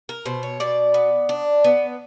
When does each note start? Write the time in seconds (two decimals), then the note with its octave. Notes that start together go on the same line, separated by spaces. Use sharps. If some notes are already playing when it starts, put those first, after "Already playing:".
0.09 A#4
0.26 B2 C5
0.43 C#5
0.60 B2 D5
0.94 B3
1.29 D4
1.64 B3